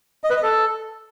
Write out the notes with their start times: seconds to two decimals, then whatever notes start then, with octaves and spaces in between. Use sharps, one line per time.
0.24 D#5
0.30 B4
0.36 D#5
0.43 A4